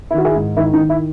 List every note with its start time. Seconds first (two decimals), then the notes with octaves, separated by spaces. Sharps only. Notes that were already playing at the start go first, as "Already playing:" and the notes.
0.11 E4
0.14 D#3 F#4
0.25 E4 G#4
0.36 G#2
0.57 D#3 E4
0.73 D#4
0.79 D#3
0.90 E4